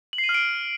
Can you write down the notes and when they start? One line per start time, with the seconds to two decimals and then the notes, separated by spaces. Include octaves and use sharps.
0.13 F#7
0.18 C7
0.24 D#7
0.29 F6
0.34 D7